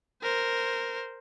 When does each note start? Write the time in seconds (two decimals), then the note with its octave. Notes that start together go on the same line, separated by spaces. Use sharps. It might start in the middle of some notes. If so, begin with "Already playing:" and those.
0.22 A#4 C5